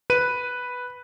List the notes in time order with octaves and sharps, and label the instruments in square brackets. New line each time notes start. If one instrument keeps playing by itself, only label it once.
[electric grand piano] B4 D#7